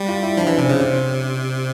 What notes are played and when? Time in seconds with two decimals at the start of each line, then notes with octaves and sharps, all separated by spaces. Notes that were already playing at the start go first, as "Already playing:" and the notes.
Already playing: G3
0.08 F4
0.23 E4
0.37 F3 D4
0.47 E3 C#4
0.58 C3
0.66 C4
0.69 C#3
0.79 C3 C4